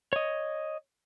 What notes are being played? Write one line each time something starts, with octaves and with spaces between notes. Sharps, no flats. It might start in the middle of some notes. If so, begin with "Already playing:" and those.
C#5 D#5